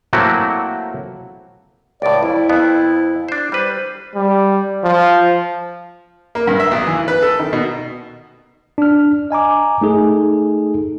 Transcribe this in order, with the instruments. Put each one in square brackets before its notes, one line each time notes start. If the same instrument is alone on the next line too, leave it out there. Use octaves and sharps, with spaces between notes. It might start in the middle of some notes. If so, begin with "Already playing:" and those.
[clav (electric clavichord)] F#3 A3 A#3 C4 E4 F#4
[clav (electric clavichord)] C#2 A2 [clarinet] D5
[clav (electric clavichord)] F2 [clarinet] E4
[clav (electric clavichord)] F2 B3
D4 C5
[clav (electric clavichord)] G3 B4 [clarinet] C5
[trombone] G3
F3
[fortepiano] A#3
G2
E5
B1
E3
B4
A4
D#3
B2
[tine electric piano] D4 F6
D#5 G#5 A#5 D6
A3 D#4 G#4 A4